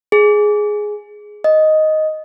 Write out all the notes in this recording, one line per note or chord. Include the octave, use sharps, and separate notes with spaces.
G#4
D#5